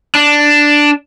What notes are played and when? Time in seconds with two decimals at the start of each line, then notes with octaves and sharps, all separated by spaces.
0.15 D4